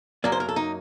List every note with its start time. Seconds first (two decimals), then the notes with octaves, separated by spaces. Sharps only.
0.24 F#2 F#3 A#3 D5
0.32 C5
0.40 A#4
0.49 A4
0.56 D#4